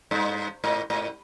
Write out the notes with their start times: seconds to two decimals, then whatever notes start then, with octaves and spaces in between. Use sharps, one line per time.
0.11 G2
0.64 G#2
0.90 G#2